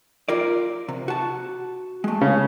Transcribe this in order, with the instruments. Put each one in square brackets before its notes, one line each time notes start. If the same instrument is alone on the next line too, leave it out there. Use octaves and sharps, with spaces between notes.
[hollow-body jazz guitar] F4 A#4 D5
C3
F#4 A5
G#3 A3
[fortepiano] C#3